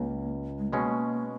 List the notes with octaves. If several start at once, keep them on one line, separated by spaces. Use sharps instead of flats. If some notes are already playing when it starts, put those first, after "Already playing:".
Already playing: C#2 A#3
G#3
B2 G#3 A#3 C#4